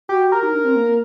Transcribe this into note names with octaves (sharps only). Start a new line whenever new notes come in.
F#4 G4
G4 A#4
D#4
D4
C4
A#3